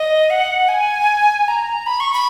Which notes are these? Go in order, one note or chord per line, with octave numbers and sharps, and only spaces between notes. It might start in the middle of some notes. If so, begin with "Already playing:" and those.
Already playing: D#5
F#5
G#5
A#5
B5
C#6
B5